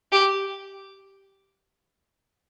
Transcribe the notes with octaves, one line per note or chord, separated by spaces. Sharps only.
G4